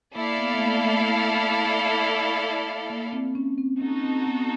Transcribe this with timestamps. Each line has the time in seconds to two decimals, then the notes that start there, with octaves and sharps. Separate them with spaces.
0.15 A#3 E4 A4 D5 F5
0.38 B3
0.54 A3
0.61 A#3
0.84 A3
2.90 A#3
3.13 C4
3.35 C#4
3.58 C4
3.81 C#4 D#4 F#4 A4
4.04 C4
4.27 B3